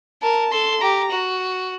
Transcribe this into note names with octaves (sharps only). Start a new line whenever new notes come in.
A#4 A5
A4 C6
G4 A#5
F#4